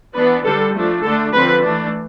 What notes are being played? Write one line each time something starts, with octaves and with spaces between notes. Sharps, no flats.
E3 B3 D4 B4
D3 G3 D4 A4
F3 A3 D4
D3 A3 D4 A4
D3 F3 C4 B4
E3 A3 D4